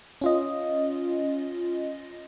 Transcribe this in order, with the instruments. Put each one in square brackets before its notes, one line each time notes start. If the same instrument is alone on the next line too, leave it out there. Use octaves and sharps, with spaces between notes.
[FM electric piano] C#4 F4 D#5